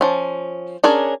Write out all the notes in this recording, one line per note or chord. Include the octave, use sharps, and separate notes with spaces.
F3 C#4
C#4 D4 G#4 A#4 C#5